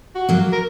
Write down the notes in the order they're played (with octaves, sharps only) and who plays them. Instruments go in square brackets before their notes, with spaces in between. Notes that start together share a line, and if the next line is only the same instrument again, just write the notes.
[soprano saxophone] F#4
[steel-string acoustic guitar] F#3 A#3
[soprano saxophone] A#4